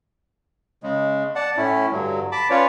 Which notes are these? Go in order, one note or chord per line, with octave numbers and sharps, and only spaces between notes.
C#3 G#3
D5 F#5 A5
A2 C#4 E4
G2 D3 F#3
A5 B5 D6
C#4 F4 B4 C#5 D5